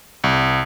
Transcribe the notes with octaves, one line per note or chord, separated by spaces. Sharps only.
C2